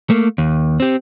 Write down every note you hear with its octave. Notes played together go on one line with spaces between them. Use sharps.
A3 A#3
D#2
C4 G4